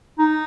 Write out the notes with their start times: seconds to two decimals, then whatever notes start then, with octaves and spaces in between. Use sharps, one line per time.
0.19 D#4